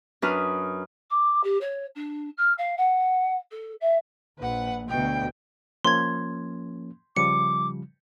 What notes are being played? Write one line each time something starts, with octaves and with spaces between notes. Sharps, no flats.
F#2 D4 B4 D#6 F6
D6
G4
C#5
D4
F6
F5
F#5
A4
E5
A#1 B4 F#5
D2 B2 G5
F3 A#3 C#4 C6 G#6
C#3 F3 G3 D6 C#7